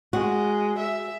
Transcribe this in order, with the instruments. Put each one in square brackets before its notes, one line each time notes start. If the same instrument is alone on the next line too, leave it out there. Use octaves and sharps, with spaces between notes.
[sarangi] G#3 [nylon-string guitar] F#4
[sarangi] E5